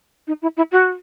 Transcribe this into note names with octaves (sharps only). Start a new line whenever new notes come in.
D#4
E4
E4
F#4